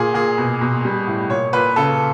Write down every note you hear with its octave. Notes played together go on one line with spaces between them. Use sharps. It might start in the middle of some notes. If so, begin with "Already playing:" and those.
Already playing: A#2 G#4
A#2 G#4
B2
B2
G3
A2
A#2 C#5
A#2 B4
C#3 A4